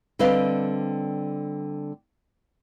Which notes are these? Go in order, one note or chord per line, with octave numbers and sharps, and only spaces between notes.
D3 G3 C4 B4 D#5 F5